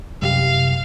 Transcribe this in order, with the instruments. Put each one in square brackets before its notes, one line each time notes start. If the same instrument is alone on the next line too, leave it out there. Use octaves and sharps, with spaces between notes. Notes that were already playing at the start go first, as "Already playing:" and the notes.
[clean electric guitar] C2 [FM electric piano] F#2 G4 [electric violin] F5